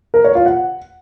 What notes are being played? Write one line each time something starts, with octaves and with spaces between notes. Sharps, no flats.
A#4
C#5
F4
F#5